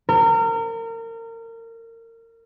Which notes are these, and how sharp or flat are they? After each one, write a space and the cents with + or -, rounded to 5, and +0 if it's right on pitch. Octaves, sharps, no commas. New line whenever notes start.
A#4 -30